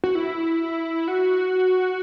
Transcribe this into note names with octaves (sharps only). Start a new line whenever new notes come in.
F#4
E4
F#4